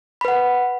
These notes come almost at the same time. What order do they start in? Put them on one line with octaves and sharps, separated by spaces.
B5 B4 F#5